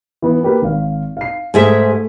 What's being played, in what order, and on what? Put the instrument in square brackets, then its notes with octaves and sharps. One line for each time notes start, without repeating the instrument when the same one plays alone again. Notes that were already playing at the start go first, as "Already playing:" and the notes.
[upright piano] E3 B3
A#3 G4 B4
G#1 F5
F5 C7
[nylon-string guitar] G#2 G#4 E5 [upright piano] A3